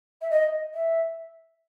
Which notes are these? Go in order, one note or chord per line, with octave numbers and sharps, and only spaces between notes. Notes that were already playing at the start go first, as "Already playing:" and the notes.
E5
D#5
E5